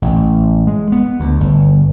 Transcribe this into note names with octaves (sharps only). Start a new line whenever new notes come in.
A1
G#3
B3
D2
G1